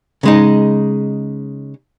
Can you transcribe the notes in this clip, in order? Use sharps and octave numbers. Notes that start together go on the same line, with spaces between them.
C#3 G#3 D#4